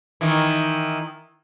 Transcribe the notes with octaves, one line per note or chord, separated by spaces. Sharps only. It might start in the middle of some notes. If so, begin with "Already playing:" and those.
D#3 E3